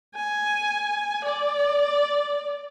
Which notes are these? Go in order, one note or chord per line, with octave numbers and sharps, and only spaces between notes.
G#5
D5